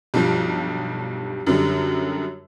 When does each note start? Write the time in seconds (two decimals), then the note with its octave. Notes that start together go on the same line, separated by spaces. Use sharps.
0.14 B1 G2 F3 G3
1.47 F#2 D3 G3